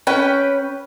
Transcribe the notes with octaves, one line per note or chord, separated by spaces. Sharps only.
C#4 B4 G5